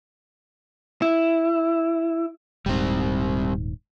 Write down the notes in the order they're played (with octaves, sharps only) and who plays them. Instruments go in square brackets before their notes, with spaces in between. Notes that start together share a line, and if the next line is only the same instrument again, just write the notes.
[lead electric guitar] E4
[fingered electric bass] D#1 G#2 [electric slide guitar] G3 C4